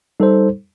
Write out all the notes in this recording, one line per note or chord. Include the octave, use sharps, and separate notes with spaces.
G3 D#4 A4 C5